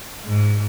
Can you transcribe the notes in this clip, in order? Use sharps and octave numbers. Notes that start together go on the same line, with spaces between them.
G#2